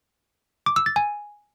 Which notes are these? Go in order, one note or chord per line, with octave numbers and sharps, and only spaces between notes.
D6
E6
A6
G#5